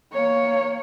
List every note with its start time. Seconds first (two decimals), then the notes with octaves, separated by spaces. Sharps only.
0.13 A#3 C#5